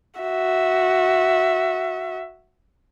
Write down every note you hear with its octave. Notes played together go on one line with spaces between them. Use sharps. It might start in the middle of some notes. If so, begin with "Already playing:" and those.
F#4 E5